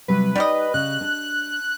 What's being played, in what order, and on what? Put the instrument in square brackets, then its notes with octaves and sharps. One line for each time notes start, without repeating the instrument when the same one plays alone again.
[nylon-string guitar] C3 F#3 G3 [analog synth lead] B4
[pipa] G3 G4 D#5 [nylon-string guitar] D#4
[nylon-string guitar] C#3 [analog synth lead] F#6
[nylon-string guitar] D4